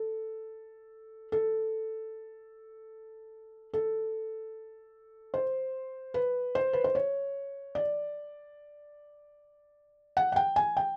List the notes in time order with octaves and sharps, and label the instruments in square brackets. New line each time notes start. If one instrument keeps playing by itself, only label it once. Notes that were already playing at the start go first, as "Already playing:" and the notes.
Already playing: [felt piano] A4
A4
A4
C5
B4
C5
B4
C5
C#5
D5
F#5
F#5
G5
G#5
G5